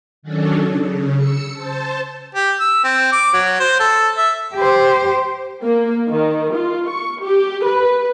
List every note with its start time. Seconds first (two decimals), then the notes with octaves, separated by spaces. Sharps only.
0.22 D#3 F#3 C#4 D4 A4
0.67 C#3
1.16 E6 C#7
1.53 C5 A5
2.35 G4
2.60 E6
2.84 C4
3.12 D6
3.33 F#3
3.60 C5
3.80 A4
4.17 E5
4.55 G4 C5
5.64 A#3
6.10 D#3
6.54 F4
6.90 C#6
7.22 G4
7.64 B4